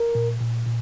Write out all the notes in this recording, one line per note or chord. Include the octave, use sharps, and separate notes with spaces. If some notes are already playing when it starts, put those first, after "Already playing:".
Already playing: A#4
A#2
A#2
A#2